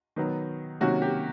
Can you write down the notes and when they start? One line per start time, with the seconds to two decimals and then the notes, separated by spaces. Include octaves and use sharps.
0.16 D#3 F#3 B3
0.81 C3 D#3 F#3 A#3 C#4 F#4
1.02 G4